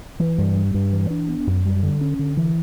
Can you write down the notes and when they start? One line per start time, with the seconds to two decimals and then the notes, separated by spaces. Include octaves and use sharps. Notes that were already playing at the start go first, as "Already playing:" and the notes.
0.19 E3
0.38 G2
0.56 G3
0.74 G2
0.93 E3
1.10 D4
1.28 B3
1.47 F#2
1.65 G3
1.83 D3
2.01 C#4
2.19 D3
2.37 E3